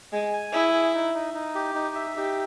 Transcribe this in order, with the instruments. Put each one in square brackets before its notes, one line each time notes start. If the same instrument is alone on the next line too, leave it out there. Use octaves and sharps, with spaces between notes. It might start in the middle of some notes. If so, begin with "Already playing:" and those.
[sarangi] G#3 [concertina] G#5
[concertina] G#5
[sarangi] E4 [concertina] G#4
[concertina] G#4
D#4
D#4
D#4
G4
D#4
E5
[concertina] D#4 [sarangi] G4